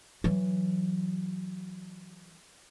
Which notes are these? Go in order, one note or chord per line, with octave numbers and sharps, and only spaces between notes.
E3 F#3